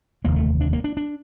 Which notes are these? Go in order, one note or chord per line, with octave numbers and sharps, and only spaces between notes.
F1 D#2 D3 A#3
A3
D4
A#3
D4
D4